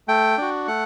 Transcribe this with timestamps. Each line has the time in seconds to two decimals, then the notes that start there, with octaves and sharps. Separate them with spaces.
0.08 A3 G5
0.38 D4 F#4
0.68 A3 F#5